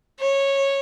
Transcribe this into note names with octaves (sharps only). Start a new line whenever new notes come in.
C#5